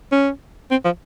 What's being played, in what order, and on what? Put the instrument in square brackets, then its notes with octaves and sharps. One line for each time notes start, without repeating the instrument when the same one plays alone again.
[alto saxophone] C#4
C4
F3